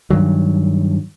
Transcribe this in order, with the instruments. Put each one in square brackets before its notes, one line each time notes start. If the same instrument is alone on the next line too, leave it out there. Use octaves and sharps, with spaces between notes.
[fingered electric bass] G2 D#3 F#3